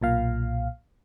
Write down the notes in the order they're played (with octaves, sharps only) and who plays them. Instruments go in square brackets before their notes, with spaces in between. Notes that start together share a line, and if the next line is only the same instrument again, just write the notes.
[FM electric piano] B1 A#2 F5